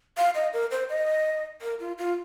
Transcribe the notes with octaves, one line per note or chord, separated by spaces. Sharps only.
F5
D#5
A#4
C5
D#5
A#4
F4
F4